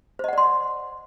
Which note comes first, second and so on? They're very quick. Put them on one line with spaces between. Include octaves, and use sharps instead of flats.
C5 D#5 F#5 D5 C6